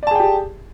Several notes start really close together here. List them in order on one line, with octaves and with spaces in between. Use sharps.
D5 A5 G#4 G5 G4